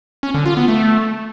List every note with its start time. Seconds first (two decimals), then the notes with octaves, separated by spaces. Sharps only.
0.23 C#4
0.34 D3
0.46 F4
0.57 B3
0.68 A3